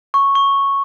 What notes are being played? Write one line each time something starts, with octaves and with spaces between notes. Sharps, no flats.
C#6
C#6